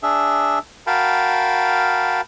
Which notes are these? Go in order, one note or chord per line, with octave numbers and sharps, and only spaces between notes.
D4 G#4 E5
F#4 A#4 F5 G5 A5 B5